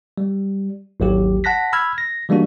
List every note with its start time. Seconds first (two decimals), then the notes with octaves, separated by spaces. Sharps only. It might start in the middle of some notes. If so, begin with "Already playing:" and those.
0.18 G3
1.00 G#1 D#2 F#3 G4
1.44 F#5 A5 F#6 A#6 B6
1.73 B5 E6 F6 G#6
1.98 A#6
2.29 E3 G3 G#3 A#3 D4 F#4